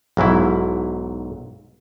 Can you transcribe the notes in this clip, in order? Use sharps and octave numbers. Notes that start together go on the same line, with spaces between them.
B1 G#2 F#3 E4